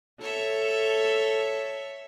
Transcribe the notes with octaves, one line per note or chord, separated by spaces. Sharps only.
A4 C#5 E5